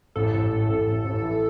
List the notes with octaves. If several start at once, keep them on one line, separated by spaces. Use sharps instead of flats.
A1 A4
A1
A2
A1
A1
A1
E3